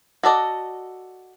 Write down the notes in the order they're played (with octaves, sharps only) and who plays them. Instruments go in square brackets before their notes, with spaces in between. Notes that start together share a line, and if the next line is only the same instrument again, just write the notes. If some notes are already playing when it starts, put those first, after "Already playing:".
[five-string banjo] F#4 A4 D5 D#5